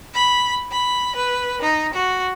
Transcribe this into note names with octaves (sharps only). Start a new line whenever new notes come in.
B5
B5
B4
D#4
F#4